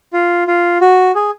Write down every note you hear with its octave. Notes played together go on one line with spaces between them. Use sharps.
F4
F4
F#4
G#4